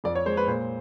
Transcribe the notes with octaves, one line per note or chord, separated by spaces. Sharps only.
F2 D5
C#5
G#3 C5
B4
A#2 C5